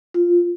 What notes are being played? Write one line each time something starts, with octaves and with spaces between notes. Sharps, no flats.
F4